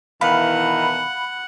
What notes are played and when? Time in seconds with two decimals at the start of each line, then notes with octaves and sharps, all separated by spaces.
0.21 B2 D#3 E3 F5 F#5 B5